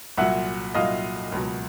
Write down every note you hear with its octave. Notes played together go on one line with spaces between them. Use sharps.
C2 A#2 F#3 E5 F#5
C2 A#2 F#3 D#5 F5
C#2 B2 F#3